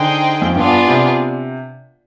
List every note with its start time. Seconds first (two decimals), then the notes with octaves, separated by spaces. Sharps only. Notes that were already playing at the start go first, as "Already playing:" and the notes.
Already playing: D3 D#4 G#4 C5 G5
0.42 F2
0.55 G2 B3 D4 F4 G#4
0.88 C3